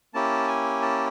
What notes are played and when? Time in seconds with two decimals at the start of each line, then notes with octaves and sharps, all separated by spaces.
0.14 A#3 C#4 E4 G4 A5
0.48 G#5
0.82 A5